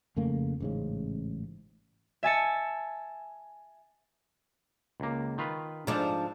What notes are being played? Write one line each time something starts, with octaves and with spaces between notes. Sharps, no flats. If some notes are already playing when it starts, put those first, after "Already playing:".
F2 C#3 A3 A#3
A1 G#2 C#3
E5 G#5 A5 C#7
C#2 A#3
D#3 F4 B4
G#2 F3 D4 A4